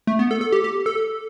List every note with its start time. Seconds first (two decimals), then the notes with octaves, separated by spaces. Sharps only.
0.07 A3
0.19 B3
0.31 A4
0.41 A4
0.52 G4
0.64 G4
0.86 A4